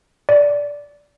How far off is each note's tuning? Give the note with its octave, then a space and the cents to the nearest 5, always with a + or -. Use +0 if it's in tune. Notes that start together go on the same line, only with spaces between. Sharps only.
D5 -10